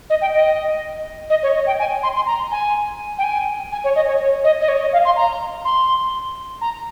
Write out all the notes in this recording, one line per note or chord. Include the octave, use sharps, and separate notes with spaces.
D#5
G5
D#5
D#5
C#5
D#5
G5
G#5
C6
C6
A#5
G#5
G5
G#5
G#5
C#5
D#5
C#5
C#5
D#5
D#5
C#5
D#5
F5
C6
A#5
C6
A#5